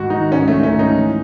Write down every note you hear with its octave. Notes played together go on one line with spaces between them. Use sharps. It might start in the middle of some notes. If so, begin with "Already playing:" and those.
Already playing: G#2 D#3 F#4
D#3 D#4
G#2 C#4
A3
D#3
C#4
G#2
D#4
E3